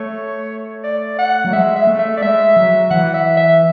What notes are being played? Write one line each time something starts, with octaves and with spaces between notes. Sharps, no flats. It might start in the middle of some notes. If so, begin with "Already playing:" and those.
Already playing: A3 C#5
D5
F#5
F#3
G#3 E5
E5
A3
E5
D5
G#3 E5
F#3
E3 F#5
E5
E5